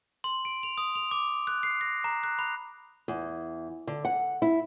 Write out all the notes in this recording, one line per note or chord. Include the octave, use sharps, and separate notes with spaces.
C6
D7
F7
D#6
F7
D6
F#6
C7
A#6
A#5
F#6
B5
E2
D3
F#5
E4